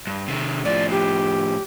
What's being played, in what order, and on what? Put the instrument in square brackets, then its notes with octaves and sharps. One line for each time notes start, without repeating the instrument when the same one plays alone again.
[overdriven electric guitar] G2
C3 D#3
[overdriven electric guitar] A2 F3 [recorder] D5
[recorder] G4